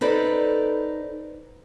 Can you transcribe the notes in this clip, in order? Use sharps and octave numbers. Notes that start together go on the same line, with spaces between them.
D#4 A4 B4 C5 D5